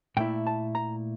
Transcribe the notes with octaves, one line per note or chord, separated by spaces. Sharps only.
A#2 A3 E4 G5
A5
A#5